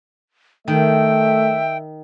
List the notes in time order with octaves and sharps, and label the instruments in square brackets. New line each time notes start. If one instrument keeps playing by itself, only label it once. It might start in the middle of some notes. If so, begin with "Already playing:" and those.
[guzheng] D#3 [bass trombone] A3 [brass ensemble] E5 [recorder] G5